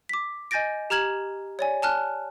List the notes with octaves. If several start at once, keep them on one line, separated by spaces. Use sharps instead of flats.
D6 B6
D#5 G#5 G6 A6 A#6 D7
G4 A#5 F6 G#6 E7 F#7
C#5 D5 G#5
G#5 A5 F6 F#6